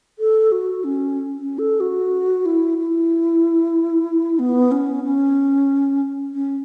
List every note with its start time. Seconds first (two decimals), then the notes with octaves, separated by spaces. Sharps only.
0.19 A4
0.52 F#4
0.84 C#4
1.38 C#4
1.59 A4
1.80 F#4
2.46 E4
2.78 E4
4.39 B3
4.72 C#4
5.04 C#4
6.33 C#4